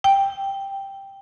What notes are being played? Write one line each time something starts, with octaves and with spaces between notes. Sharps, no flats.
G5